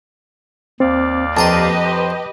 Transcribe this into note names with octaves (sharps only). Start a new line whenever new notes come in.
D#2 C4 D5 F5
F2 G4 B4 D#5 A5 A#5 C6
C5